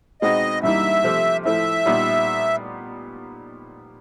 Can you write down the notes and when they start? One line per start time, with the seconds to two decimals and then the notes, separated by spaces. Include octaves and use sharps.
0.22 B2 G#3 C4 D#4 D#5
0.63 G2 E3 G3 A#3 D#4 E5
1.04 C3 F3 A3
1.45 A2 F3 A3 E5
1.86 A#2 G3 B3 D#4